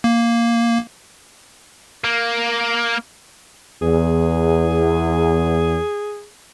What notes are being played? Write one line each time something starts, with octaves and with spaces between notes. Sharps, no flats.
A#3
A#3
E2 G#4